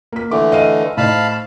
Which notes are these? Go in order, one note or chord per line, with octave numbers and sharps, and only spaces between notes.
A#3 B6
D3 E3 A3 D6
D#5 F5 D#7
A2 D#4 C5 F5 A5 B5